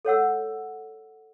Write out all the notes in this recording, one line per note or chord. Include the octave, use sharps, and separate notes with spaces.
A4 C#5 F#5 E6